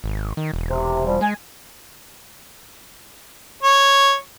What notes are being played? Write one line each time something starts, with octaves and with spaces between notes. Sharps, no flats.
G#1
D#3
E1
C3
F3 G3
G#3 G#5
C#5